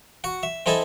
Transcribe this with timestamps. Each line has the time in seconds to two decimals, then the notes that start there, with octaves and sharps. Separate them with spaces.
0.24 F#4 F#5
0.43 E5
0.66 C4 E4 A4 D#5 G#5 A5